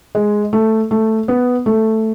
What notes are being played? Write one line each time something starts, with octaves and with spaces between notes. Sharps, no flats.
G#3
A3
A3
B3
A3